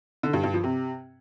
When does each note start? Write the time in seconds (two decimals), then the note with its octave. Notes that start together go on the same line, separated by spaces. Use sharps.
0.23 D3
0.33 G2
0.44 G2
0.54 F3
0.64 C3